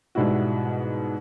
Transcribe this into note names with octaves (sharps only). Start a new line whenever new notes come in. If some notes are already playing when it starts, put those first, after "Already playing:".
G#2 B2 G3 E4 F#4